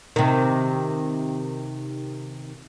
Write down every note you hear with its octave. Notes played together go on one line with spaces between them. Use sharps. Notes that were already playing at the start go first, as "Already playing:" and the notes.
C3 D#3